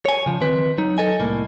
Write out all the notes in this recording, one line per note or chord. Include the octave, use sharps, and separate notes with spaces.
C#5 G#5
C#3 F3
D#3 C4 B4
F#3 D#4
A4 D#5 G#5
C2 A2 A#3